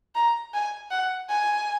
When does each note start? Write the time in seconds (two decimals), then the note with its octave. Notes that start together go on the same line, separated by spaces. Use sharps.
0.15 A#5
0.54 G#5
0.91 F#5
1.30 G#5